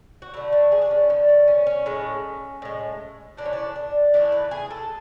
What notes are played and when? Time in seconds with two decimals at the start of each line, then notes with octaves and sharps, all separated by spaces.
0.22 F#4
0.34 D3 A3 E4
0.53 F#4
0.72 G#4
0.82 D4
0.91 C#4
1.09 D3 B3
1.13 A3
1.29 C#4
1.48 C#4
1.67 C#4
1.86 A2 G#3
2.62 A2 G#3
3.37 A2 E3 A3 D4
3.45 C#4
3.53 D4
3.76 D4
4.14 A2 E3 A3 D4
4.32 B4
4.51 G#4
4.71 A4